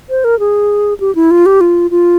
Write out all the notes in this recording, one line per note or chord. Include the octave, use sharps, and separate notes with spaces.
C5
A#4
G#4
G4
E4
F4
G4
F4
F4